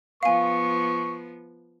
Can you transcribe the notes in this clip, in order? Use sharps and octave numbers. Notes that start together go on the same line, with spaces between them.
F3 B3 F5 G#5 C#6